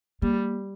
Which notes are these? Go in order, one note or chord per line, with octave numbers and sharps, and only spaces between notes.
G3 A#3